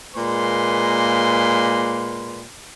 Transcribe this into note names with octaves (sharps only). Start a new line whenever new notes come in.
A#2 G#3 A#3 B4 C6